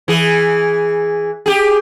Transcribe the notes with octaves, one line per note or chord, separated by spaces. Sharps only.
E3 G#4
G4 G#4